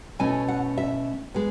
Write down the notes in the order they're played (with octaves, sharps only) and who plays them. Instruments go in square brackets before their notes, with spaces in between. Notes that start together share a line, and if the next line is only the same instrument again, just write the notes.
[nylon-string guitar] B2 A3 C#4 E4 G#5
F#5
E5
G#3 B3